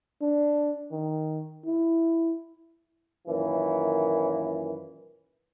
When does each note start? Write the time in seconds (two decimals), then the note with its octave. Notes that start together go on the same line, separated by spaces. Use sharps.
0.22 D4
0.92 D#3
1.65 E4
3.28 F#2 A#2 D#3 E3